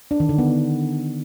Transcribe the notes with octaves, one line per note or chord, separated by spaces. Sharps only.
D4
D#3
D3
B3